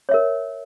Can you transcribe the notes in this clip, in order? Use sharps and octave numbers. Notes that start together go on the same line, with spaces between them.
A#4 C#5 E5